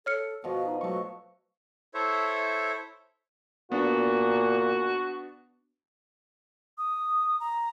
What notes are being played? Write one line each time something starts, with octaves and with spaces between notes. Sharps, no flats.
A4 C#5 F6 C#7
B2 F3 F#4 D#5
D#4
F#3 A3 C#6
E4 A4 C5 C#5 E5
A#2 B3 D4 F#4
D#6
A#5